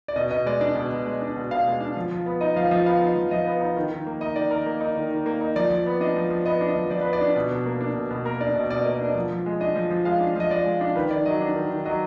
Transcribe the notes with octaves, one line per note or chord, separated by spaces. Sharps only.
D5
B2 D#5
B2 D#5
G#3 D5
D4 D5
B2
B2
G#3
D4
B2
B2 F5
G#3
D4
F3
F3
B3
D#4 D#5
F3 F5
F3 D#5
B3 F5
D#4
F3
F3 D#5
B3
D#4
D#3
D#3
A#3
D#4 D#5
D#3 D5
D#3 A#4
A#3
D#4
D#3
D#3
A#3
D#4
F3 D5
F3
B3
D4 D#5
F3
F3
B3 D#5
D4
D#5
F3
F3 D5
B4
B3
D5
D4
B2
B2
A#3
D4
B2
B2
A#3 A#4
D4 D5
B2 D#5
B2 D5
D#5
A#3
D5
D4 D#5
F3
F3
G#3
D4 D#5
F3
F3
G#3 F5
D4
F3 D#5
F3 D5
G#3
D4
D#3 B4
D#3 D5
F#3 D#5
D4
D#3
D#3
F#3 D#5